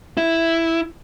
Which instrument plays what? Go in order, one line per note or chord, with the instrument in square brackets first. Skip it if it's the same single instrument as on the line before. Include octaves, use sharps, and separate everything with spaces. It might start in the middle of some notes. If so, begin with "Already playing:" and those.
[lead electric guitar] E4